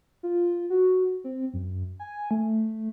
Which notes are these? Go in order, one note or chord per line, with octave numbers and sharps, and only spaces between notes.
F4
F#4
C4
F#2
G#5
A3